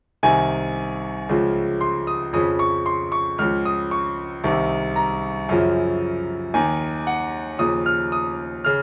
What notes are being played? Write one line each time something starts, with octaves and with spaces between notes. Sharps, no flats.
C2 C3 D#3 G#5
C#2 C#3 F3
C6
D#6
F2 C#3 F3 D#6
C#6
C6
C#6
C#2 C#3 F3 F6
D#6
C#6
C2 C3 D#3
A#5
F#2 C#3 F3
D#2 D#3 G#5
F#5
D#2 C#3 F3 D#6
F6
D#6
C#3 F6